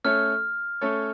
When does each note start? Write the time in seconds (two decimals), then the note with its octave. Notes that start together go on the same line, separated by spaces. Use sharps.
0.04 A3 C#4 A4 C#5 F6
0.81 A3 C#4 A4 C#5